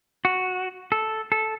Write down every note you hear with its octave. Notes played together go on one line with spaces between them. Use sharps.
F#4
A4
A4